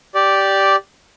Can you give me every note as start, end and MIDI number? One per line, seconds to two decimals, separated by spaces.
0.15 0.76 67
0.15 0.76 74